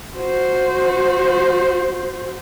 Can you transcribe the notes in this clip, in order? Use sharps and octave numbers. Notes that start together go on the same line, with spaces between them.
F#4 C5